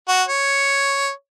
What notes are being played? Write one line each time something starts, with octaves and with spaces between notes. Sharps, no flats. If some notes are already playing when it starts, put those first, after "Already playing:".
F#4
C#5